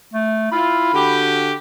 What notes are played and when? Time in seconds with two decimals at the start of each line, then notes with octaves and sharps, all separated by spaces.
0.14 A3
0.52 E4 F4 B5
0.93 D3 F#4 G4